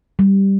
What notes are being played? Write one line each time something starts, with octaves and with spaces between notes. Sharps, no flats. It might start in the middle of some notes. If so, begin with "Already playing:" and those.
G3